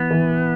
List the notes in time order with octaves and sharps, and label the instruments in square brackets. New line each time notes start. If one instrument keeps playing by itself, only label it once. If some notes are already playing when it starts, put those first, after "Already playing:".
Already playing: [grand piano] E3 [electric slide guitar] B3
[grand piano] E3